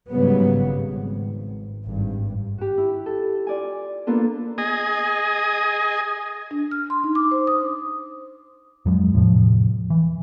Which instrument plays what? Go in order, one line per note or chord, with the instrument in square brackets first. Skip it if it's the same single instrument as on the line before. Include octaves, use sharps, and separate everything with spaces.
[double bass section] G#2 C#3 F#3 G3 B3
G#1
G#1 G2
[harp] F#4 G4
E4
A4
F4 D5 G#5
A#3 B3 D4 F4 A4
[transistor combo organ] G#4 D#5
[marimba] D4
F6
C6
D#4
D6
C5
D#6
[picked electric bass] F2 F#3 G#3
E2 A2 C3 F3
E3